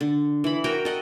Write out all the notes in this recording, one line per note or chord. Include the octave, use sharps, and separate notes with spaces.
D3
E3 B5
F#4 A#4 G5
A4 D#5 F#5